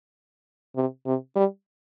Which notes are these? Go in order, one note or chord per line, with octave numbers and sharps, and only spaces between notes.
C3
C3
G3